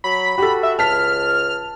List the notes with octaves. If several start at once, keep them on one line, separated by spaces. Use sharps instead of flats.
F#3 B5
F#4 G4 A4
E5
C#2 A5 F6 B6